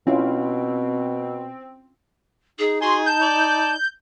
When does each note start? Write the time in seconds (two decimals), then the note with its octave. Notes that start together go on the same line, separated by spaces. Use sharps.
0.07 B2 C4 C#4 E4 F4
2.58 D#4 G#4
2.82 F#4 G#4 C6
3.06 A5 G6
3.22 D5